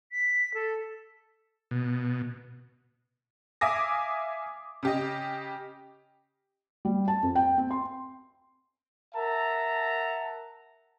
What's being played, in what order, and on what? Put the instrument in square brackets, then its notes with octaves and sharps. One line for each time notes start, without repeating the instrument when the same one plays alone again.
[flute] B6
A4
[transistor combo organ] B2
[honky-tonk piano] E5 F5 G#5 D6 D#6 A#6
C#3 G4 D#5
[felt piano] G3
A5
F2
G5
C4
C6
[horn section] A#4 E5 F#5 A5 A#5